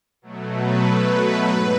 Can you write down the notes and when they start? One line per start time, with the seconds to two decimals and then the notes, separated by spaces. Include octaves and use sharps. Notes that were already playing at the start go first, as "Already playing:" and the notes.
0.22 B2 F#3 A3
0.53 B4
0.85 B4
1.48 G#2